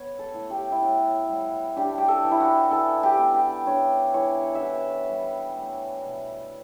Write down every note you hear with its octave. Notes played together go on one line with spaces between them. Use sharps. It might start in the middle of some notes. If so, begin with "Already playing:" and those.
Already playing: B3 C#5
A4
A2
G4
E4
A2 F#4
G3
D4 G4
G4
A4
E3
E4
F#4
E3 A4
G4
B3
G4
D4 C#5
E3 C#5
E5
E3 F#5
G3
A3
B2